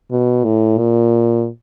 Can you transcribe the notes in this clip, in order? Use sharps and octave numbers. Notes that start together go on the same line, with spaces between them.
B2
A2
A#2